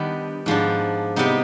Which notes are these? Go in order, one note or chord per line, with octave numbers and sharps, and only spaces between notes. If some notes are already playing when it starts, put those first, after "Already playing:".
Already playing: D#3 G3 B3 D4
G#2 F3 B3 D4
C3 G3 B3 D#4